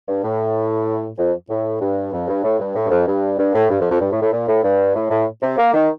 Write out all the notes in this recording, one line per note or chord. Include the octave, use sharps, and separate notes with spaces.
G2
A2
F2
A2
G2
F2
G2
A2
G2
A2
G2
F2
G2
G2
A2
G2
F2
F2
G2
A2
A2
A#2
A2
G2
A2
A2
C3
A#3
D#3